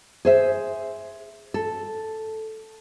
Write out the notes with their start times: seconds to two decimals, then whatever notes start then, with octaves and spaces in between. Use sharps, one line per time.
0.25 G#4 C5 E5
1.54 A4